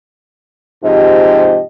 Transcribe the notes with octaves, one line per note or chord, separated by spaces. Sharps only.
G#2 C3 F3 G4 D#5